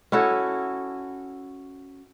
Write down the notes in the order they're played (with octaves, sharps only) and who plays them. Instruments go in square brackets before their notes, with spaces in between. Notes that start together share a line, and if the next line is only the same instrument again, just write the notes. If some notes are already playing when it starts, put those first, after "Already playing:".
[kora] C#4 E4 F#4 A4